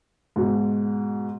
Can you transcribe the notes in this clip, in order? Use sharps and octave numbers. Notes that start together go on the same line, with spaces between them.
G#2 B2